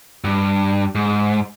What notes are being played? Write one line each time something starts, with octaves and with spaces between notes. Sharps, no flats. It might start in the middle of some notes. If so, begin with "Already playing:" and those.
G2
G#2